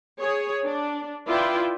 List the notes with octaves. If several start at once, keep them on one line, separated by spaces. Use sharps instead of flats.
G#4 C#5
D4
E4 F4 B4 D5 E5 G5